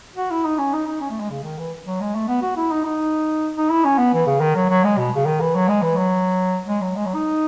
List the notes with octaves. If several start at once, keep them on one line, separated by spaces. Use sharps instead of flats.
F#4
E4
D#4
C#4
D#4
D#4
C#4
A3
G#3
C#3
D#3
E3
F#3
G#3
A3
B3
F#4
E4
D#4
D#4
D#4
E4
C#4
B3
E3
C#3
D#3
F#3
F#3
G#3
B2
C#3
D#3
E3
F#3
G#3
E3
F#3
G#3
F#3
G#3
F#3
D#4